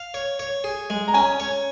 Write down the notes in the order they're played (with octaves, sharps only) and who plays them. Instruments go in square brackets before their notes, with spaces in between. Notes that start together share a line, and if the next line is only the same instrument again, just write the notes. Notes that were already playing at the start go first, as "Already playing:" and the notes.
Already playing: [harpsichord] F5
C#5
C#5
G#4
G#3
[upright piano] A#5
[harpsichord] C#4 [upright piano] G#5
[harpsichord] C#5